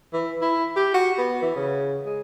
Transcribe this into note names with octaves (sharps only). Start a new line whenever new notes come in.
E3
E4
G4
F#4
B3
E3
C#3
G#3